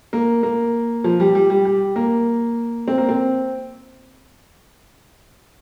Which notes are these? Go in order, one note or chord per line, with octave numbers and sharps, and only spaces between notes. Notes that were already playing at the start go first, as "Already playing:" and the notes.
A#3
A#3
F3
G3
G3
G3
G3
A#3
C4
A#3
C4